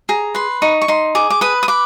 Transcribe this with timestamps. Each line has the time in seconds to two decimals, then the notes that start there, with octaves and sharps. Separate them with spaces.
0.09 G#4 A#5
0.35 B4 C6
0.62 D#4 C#6
0.81 C#6
0.88 D#4 C6
1.15 G#4 D6
1.30 D6
1.41 B4 D#6
1.63 D#6
1.68 B4 D6